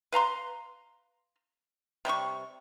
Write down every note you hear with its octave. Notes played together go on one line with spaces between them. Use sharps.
B4 F5 A#5 C6
C3 G3 D4 C#6